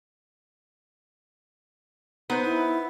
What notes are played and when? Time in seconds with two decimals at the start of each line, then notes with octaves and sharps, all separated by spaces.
2.30 B3 D#4 B4 C5
2.45 E4